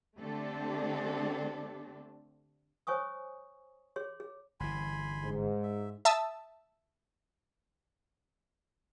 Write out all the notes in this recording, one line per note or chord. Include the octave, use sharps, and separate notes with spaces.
D3 A3 C4 D4 G4 A4
C5 C#5 G#5 C#6 D#6
G#4 C#5 C6
G#4
G1 E3 G#5 B5 C6
G#2
E5
E5 A5 D#6 E6